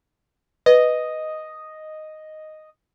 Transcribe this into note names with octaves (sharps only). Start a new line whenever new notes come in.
B4 D#5